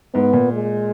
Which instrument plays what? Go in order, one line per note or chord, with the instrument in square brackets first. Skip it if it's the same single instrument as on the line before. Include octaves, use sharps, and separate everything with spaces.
[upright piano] G#2 [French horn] B3
[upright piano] A#2
[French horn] G#3